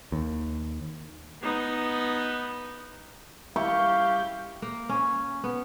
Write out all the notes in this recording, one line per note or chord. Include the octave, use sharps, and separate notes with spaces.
D#2
B3 D#4
G3 E4 G4 F5 C#6
A#3
C#4
B3